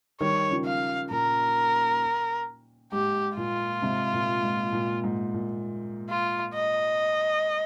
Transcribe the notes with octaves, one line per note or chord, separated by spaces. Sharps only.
D#3 G3 C#5
C#3 F3
F5
A#2 A#4
G#2 G4
A#2 F4
G#2 C3
A#2
G#2
A#2
G#2
A#2
F4
D#5